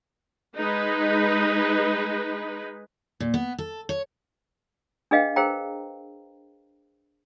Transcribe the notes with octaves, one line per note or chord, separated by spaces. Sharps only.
G#3 D#4 B4
A#2
B3
A4
C#5
D4 G#4 B4 D#5 F5 G5
G#4 A#4 C5 F5 G5 A#5